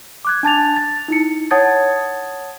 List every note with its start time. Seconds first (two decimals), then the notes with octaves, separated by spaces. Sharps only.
0.25 D6 F#6 G#6
0.43 D4 A5 A6 F7
0.76 A6
1.08 D#4 E4 C#7
1.51 C#5 F#5 A5 D#6 G#6 A6